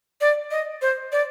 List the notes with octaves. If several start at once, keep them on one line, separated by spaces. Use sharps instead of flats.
D5
D#5
C5
D5